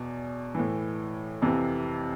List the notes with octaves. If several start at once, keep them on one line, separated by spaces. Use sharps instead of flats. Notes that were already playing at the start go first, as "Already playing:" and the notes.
Already playing: E2 B2
A2 E3
F2 C3 E3